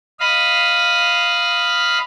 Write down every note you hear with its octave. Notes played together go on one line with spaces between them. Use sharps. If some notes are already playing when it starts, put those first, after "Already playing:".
D#5 F5 B5